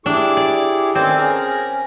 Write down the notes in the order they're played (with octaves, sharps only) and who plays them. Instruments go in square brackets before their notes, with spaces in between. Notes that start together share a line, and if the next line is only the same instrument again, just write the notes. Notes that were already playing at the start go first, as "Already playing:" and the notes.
[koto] D4 [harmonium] E4 G4 G#4 [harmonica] D6
[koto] D5
[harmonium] D#3 C#4 [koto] C4 [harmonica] A4 D5 G#5
[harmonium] C#4 [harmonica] G#4 A#4